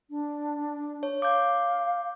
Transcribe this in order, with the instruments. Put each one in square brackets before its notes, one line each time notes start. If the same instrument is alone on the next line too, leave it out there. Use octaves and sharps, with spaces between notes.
[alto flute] D4
[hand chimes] C#5
[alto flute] F5 [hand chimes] D6 G6